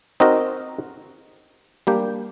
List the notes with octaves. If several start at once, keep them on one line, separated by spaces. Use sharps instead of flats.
C4 D#4 F#4 A#4 D#5
G3 A#3 D4 G4